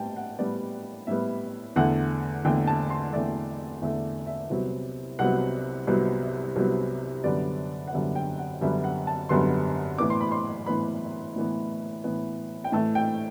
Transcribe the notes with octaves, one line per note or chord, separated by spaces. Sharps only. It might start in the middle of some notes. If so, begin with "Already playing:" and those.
Already playing: A2 G3 B3 G5 A5
F#5
A2 G3 B3 D5
A2 G3 B3 E5
E2 D3 A3 F#5
E2 D3 A3 G5
A5
C6
E2 D3 A3 D5
E2 D3 A3 E5
E5
C2 C3 F#3 B3
C2 C3 F#3 B3 F#5
C2 C3 F#3 B3
C2 C3 F#3 B3
F#2 D3 G3 B3 D5
F#5
F#2 D3 G3 B3 E5
G5
F#5
F#2 D3 G3 B3 E5
F#5
A5
F#2 D3 G3 B3 C6
A2 E3 B3 D6
C6
B5
C6
A2 E3 B3 B5
A2 E3 B3
A2 E3 B3
G5
A2 E3 A3 A5
G5